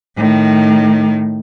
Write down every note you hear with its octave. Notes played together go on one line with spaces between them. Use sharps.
A2 D#3